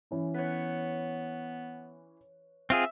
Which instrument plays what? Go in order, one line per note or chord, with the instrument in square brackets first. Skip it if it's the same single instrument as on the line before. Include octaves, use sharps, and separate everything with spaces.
[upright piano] E3 C#4 E4
[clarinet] B3 [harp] B4 C#5
[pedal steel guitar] C4 F4 G#4 [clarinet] E5